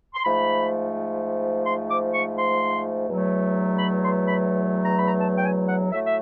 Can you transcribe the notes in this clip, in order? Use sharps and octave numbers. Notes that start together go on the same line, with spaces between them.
C6
G#2 F3 A3 B5
C6
D6
C#6
C6
E2 B2 F#3 A3
B5
C6
B5
A#5
B5
A#5
A5
G5
G#5
F#5
A2 F#3 A3 E5
E5